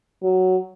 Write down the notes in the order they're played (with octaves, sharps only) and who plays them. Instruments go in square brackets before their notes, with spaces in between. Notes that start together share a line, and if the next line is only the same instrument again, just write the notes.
[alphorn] F#3